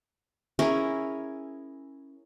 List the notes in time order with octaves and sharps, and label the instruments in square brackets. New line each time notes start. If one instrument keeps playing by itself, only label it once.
[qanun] C#4 E4 G#4 A#4